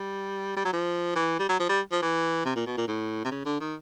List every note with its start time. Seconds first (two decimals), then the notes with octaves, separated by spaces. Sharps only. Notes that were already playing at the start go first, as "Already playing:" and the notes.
Already playing: G3
0.57 G3
0.65 F#3
0.73 F3
1.15 E3
1.39 G3
1.49 F#3
1.60 F3
1.69 G3
1.92 F3
2.02 E3
2.45 C3
2.56 A#2
2.66 B2
2.77 A#2
2.87 A2
3.24 C3
3.31 C#3
3.45 D3
3.60 D#3